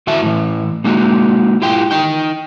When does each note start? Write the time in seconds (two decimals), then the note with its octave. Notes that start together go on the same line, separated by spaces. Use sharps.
0.07 E2 E3 F#4 E5 A5
0.23 A2 E3
0.84 G#3 A#3 D#4 F#4
1.62 E4 F4 G4 G5
1.91 D#4 G5